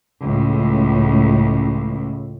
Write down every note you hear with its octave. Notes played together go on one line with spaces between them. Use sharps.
C#2 A2